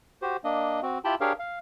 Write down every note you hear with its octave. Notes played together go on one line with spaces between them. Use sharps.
F#4 G4 C5
A#3 D4 D#5
C4 F#4
E4 F4 G4 G5 A5 B5
D4 G4 G#4 A#4 C#5 F5
F5